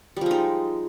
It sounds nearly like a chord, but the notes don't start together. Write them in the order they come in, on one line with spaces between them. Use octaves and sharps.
G3 F3 G#3 D#4